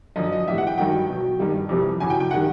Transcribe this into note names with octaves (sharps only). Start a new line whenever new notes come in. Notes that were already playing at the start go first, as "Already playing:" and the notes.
F#2 D3 F3 D#5
D#5
A2 E3 G3 E5
F#5
G5
G2 D#3 F#3 G5
B2 F#3
G2 D#3 G3
F2 C3 E3 G3
E2 C#3 F#3 G#5
G5
G5
D#3 G3 F#5